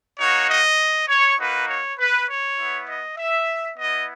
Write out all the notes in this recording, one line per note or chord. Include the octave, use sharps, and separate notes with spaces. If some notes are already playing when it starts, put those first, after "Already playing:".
A#3 D#4 F#4 C#5
D#5
C#5
A#3 D#4 F#4 B4
C#5
B4
C#5
B3 E4
D#5
E5
B3 E4 D#5